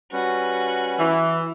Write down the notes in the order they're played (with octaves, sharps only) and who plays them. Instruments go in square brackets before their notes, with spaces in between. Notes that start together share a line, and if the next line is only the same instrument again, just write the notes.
[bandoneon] G3 C#4 B4 [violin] F#4
[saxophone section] E3